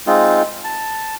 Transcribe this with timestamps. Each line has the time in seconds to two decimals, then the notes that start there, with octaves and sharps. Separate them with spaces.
0.07 G#3 C4 D#4 F4
0.64 A5